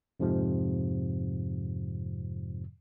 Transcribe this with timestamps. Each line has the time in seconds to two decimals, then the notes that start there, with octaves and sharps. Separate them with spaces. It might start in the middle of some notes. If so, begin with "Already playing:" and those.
0.20 F2 G#2 C3 F3